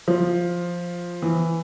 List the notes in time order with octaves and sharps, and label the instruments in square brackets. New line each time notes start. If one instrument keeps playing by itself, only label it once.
[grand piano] F3
E3